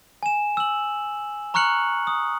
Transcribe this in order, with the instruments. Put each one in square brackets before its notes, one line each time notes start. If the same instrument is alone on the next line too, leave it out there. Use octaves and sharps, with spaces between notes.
[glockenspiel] G#5 E7
E6 F#7
A#5 C#6 F6 F#6 C#7 F#7
D#6